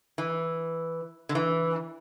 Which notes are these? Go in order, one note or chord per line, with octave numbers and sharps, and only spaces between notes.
E3
D3
E3